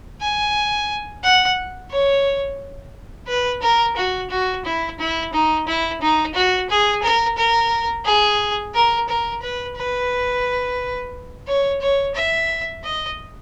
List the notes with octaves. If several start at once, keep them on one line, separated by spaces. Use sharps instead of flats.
G#5
F#5
C#5
B4
A#4
F#4
F#4
E4
E4
D#4
E4
D#4
F#4
G#4
A#4
A#4
G#4
A#4
A#4
B4
B4
C#5
C#5
E5
D#5